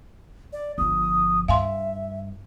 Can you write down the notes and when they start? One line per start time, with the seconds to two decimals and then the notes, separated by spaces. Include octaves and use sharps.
0.53 D5
0.78 G1 F3 D#6
1.48 G2 E5 F5 G#5 C6